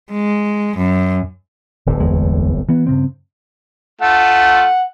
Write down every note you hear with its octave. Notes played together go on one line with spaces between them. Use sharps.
G#3
F#2
D1 G1 A2
E2 G#3
E3 B3
G2 C#3 C4
A3 F4 F#5 A5